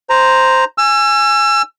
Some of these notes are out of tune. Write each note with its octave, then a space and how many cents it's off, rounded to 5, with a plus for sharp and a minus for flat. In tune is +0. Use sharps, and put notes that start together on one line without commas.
C5 +0 A#5 +0
G#5 +0 E6 +35